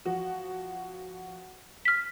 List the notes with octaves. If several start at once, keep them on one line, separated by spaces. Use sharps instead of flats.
F3 F#4
F6 B6